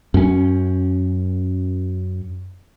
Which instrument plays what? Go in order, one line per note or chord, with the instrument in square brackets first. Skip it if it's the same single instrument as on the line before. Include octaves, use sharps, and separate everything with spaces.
[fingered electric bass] F#2 C#4